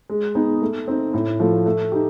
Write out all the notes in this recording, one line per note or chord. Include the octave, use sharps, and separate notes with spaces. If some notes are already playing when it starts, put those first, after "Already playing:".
G#3
B3 D#4 G#4
A3
C4 D#4
A2
F3 A3
A3
D#4 G4